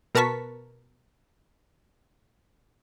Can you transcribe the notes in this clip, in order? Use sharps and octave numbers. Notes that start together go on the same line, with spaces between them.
B2 A#4 B4 A5 C#6 B6